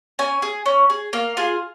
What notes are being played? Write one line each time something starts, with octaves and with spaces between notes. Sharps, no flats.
C#4 G#5
G#4
C#4
G#4
A#3 F5
F4 G#4